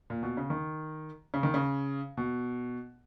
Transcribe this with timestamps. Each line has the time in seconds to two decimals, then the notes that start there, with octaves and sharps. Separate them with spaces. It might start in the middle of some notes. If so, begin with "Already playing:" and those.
0.10 A#2
0.23 B2
0.37 C#3
0.50 D#3
1.34 C#3
1.43 D#3
1.54 C#3
2.17 B2